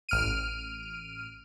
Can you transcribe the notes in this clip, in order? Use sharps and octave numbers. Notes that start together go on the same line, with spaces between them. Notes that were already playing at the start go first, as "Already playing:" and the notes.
A1 F6 D7 D#7